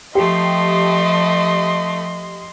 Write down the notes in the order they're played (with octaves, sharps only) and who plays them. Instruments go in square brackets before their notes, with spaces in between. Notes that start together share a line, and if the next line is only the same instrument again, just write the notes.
[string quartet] F3 A3 [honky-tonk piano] G4 [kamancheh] D#5 C6